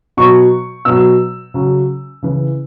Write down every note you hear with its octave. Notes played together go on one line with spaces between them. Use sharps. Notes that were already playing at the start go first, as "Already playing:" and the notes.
B2 F#3 C#6
B2 F#3 E6
C#3 F#3
C#3 E3